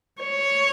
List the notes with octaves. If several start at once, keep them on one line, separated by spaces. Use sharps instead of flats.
C#5